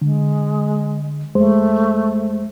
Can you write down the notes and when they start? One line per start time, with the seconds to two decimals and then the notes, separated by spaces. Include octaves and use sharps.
0.01 D3 G#3
1.35 F2 G#3 A3 C5